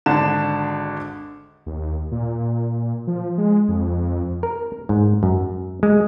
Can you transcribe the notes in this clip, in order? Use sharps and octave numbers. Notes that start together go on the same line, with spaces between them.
G#1 D3 D4 E7
D#2
A#2
F3
G#3
F2
A#4
G#2
F#2
G#3